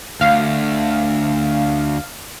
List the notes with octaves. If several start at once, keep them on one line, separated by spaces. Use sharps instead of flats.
D2 F5